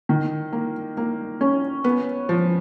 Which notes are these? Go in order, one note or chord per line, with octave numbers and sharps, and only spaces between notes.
D#3
A#3
A#3
C#4
B3
F3